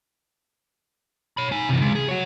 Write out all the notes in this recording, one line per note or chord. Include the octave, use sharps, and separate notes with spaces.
C#5 B5
D#4 G#5
C3 E3
C#3 G#3
G#4
F#4 C#5